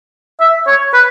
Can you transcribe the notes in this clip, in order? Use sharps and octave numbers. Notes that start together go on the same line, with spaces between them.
E5
C#5
B4